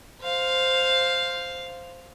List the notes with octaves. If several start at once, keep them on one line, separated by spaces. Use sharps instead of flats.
C5 F5